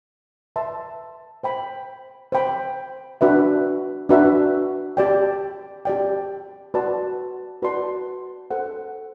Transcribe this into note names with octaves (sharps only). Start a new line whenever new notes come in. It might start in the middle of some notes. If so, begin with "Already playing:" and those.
B4 E5 A5 C6
C5 G5 B5
C5 G5 B5
D4 F#4 B4 E5
D4 F#4 B4 E5
G4 D5 G5
G4 D5 G5
F#4 B4 D5 A5 C6
F#4 B4 D5 A5 C6
A4 C5 F#5